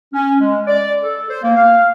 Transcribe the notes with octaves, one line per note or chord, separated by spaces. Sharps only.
C#4
G#3
D5
A4
C5
A#3
F5